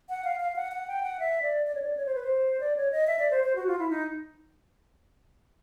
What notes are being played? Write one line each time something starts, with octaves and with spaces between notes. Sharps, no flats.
F#5
F5
F5
F#5
F#5
G5
F#5
E5
D5
D5
C#5
D5
C#5
C5
B4
C5
D5
C#5
D#5
E5
D5
C5
C5
F#4
F4
E4
D#4